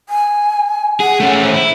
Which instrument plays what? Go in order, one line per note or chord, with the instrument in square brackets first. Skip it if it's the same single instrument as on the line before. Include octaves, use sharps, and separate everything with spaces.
[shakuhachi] G#5
[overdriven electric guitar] G#4 [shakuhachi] F#5
[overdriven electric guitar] A3 C#4
[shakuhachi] C5
[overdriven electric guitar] E4